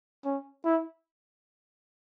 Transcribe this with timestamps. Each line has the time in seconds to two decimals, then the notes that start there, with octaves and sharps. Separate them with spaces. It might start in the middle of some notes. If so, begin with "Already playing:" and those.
0.25 C#4
0.64 E4